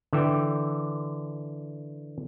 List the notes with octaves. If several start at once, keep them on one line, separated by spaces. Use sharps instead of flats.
D3 E3 E5 G5